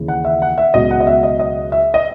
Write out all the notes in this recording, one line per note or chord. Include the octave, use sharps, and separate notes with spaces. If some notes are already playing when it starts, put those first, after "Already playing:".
Already playing: D#2 C#3 E3
F#5
E5
F#5
E5
C#2 B2 F#3 D#5
F#5
D#5
E5
D#5
D#5
E5
D#5